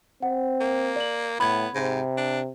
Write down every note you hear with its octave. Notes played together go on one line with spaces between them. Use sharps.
C4 F#5
A#3
D5 F#7
A2 B3 B5 G#6
G#2 C3
D4